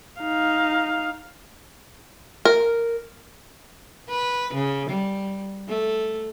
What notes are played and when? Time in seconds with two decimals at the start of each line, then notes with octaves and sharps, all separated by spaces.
0.21 D#4 F5
2.45 A#4
4.09 B4
4.54 C#3
4.89 G3
5.68 A3